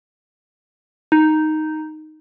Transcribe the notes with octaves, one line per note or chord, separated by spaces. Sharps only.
D#4